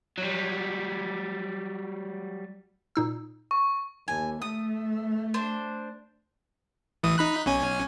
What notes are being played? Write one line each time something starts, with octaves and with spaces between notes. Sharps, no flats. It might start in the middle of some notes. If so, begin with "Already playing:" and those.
F#3 G3
A#2 D#4 E6
C#6
D#2 G#5
A3 D#6
D4 C5
A1 E3 D#6
D#4 B5 F#6
B1 C#4 G#5